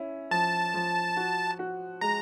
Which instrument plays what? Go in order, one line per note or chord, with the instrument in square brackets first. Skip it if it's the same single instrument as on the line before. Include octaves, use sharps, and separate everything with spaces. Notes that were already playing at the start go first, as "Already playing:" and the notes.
Already playing: [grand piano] C#4 E4
[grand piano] F3 [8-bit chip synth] A5
[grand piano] F3
F#4
F#4
[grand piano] G#3 [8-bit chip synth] A#5